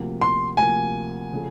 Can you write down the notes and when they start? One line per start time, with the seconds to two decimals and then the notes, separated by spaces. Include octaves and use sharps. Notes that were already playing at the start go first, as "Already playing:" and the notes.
Already playing: D2 C3 F3 A#3
0.21 C6
0.57 D2 C3 F3 A#3 G#5
1.33 C#3 F3 A3